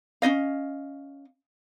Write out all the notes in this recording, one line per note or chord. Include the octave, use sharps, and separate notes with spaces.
C#4 D#4 D#5 F5